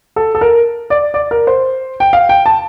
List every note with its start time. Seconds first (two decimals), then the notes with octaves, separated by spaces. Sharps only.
0.16 A4
0.35 A4
0.41 A#4
0.90 D5
1.14 D5
1.31 A#4
1.47 C5
2.00 G5
2.13 F5
2.29 G5
2.46 A5